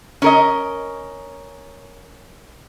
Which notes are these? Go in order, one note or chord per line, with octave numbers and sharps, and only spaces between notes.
C#4 A#4 D#5